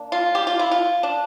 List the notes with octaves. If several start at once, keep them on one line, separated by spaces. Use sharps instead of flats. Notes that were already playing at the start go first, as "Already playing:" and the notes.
Already playing: A#3 D4
F4
G4
F4
E4
F4
D4